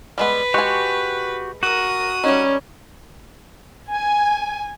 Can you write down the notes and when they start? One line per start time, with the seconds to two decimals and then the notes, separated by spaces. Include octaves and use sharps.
0.18 G3 G#3 B3 B4
0.54 G#3 F#4 G4 G#5 C#6
1.63 F#4 A#4 D#6
2.24 G3 C#4 D#4
3.92 G#5